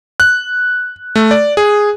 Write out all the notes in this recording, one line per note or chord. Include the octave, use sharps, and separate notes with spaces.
F#6
A3
D5
G#4